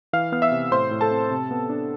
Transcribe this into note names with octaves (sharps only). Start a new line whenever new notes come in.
E3 F5 F6
B3 F6
E5 E6
C3
A2 C5 C6
A2
A4 A5
C4
C3
B3
D4